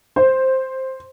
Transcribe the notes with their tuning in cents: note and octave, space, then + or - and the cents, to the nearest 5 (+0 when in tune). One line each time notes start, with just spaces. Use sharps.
C5 +5